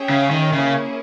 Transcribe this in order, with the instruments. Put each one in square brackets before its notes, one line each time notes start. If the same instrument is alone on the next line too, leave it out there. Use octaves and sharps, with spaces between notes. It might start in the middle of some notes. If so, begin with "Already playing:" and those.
Already playing: [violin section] C#4 G#4 C#5 E5 G5
[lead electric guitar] C#3
D#3
[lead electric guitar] C#3 [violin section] A#3 C#4 E4 G#4